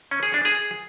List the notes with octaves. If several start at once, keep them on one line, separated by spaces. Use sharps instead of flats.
C#4
G#4
D4
G#4